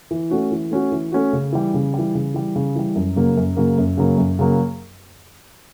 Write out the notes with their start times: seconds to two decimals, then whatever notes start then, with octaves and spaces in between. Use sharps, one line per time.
0.11 E3
0.31 A3 C#4 F#4
0.51 E3
0.71 A3 C#4 F#4
0.92 E3
1.12 A3 C#4 F#4
1.33 C#3
1.52 E3 G3
1.74 C#3
1.94 E3 G3
2.15 C#3
2.34 E3 G3
2.56 C#3
2.75 E3 G3
2.96 F#2
3.16 C#3 F#3 A#3
3.37 F#2
3.57 C#3 F#3 A#3
3.78 F#2
3.97 C#3 F#3 A#3
4.18 F#2
4.39 C#3 F#3 A#3